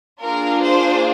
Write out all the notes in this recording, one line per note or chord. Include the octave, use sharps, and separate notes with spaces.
A#3 D4 F4 G#4 A#4
C5